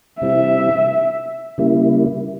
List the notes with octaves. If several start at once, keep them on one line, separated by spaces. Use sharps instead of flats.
C3 G3 C4 E4 E5
C#3 G3 A#3 E4